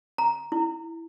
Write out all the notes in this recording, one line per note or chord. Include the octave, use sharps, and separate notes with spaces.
A#5
E4